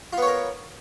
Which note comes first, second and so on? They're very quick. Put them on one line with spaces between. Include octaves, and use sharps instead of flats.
F4 B3 C#5 A#4